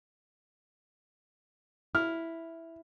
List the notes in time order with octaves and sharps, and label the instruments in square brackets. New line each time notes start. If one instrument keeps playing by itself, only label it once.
[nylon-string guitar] E4 [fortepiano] F6